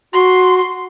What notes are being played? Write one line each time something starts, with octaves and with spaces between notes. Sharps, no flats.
F#4 C6